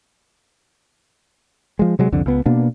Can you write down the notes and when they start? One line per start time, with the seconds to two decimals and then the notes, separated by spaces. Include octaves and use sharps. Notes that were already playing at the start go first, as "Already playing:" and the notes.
1.79 F3 G#3
1.99 C3 F#3 G#3
2.12 C2 F2 D3
2.26 C#2 B3
2.46 B2 A#3 B3 D4